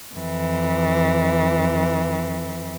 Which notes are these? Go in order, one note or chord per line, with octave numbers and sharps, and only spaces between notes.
F2 E3